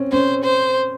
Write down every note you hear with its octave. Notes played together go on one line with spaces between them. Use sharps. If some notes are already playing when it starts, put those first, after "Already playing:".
Already playing: C4 C#4
C#4 C5
C5